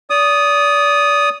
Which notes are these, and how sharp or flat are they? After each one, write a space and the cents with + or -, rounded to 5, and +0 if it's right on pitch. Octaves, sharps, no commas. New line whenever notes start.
D5 -30 D#6 +0